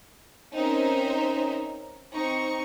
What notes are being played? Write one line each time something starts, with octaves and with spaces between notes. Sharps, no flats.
C4 C#4 D#4 A#4 C5 E5
C4 D#4 C#6